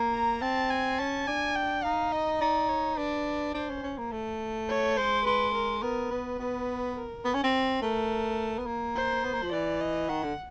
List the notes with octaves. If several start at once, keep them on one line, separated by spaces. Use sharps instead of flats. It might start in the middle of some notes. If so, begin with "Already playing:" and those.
Already playing: A#3
A#5
C4 A5
G#5
C#4 A5
D4 G#5
G5
D#4 F5
D#5
D#4 D5
C#5
D4 B4
D4 C5
C#4
C#4
A#3
A3
C#5
G#3 C5
G#3 B4
A#4
B3 A#4
B3 B4
B3
A#4
B3
C#4
C4
A3 A#4
B3
A#3
C5
B3
A#3
F3
E3 D5
D#5
D#3 F#5
D3